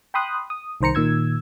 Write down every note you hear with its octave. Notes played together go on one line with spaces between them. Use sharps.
G5 B5 C6 D#6 F#6
D#6
C2 D#3 C5 A#5 C#7
A#2 D#3 E6 G#6